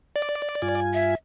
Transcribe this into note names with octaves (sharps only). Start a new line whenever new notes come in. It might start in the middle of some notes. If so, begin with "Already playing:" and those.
D5
G2 F4 G#5
E5